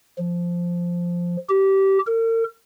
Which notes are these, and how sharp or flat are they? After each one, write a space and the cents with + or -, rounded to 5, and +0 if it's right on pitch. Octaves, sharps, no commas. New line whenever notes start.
F3 -5
G4 -20
A#4 -40